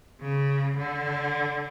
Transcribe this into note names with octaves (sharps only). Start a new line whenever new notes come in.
C#3
D3